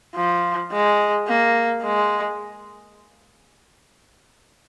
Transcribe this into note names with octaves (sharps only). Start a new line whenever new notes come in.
F3
G#3
A#3
G#3